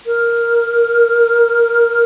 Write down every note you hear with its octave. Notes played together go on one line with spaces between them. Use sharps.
A#4